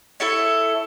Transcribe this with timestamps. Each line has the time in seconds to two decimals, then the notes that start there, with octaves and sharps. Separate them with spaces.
0.20 E4 A4 C#5